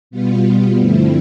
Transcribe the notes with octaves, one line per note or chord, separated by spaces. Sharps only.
B2 G3 B3 F4
G2 D3 F3 A3 C4 E4